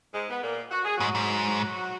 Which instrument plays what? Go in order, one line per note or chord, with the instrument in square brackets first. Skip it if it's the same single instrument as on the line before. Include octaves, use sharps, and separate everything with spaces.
[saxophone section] G#2 G#3
B3
A#2 A#3
F#4
G#4
[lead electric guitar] G#2 [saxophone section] F#3 F#4
[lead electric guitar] G#2